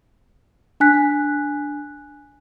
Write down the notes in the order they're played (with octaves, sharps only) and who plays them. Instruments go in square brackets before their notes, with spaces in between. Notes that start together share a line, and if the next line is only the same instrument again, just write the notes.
[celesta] D4 G#5 F#6 B6